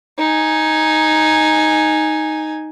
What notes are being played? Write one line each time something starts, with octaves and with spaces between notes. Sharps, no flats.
D#4 G#5